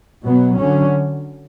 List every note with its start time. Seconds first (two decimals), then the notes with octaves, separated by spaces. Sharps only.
0.25 B2 F#3 B3
0.59 D3 F#3 C#4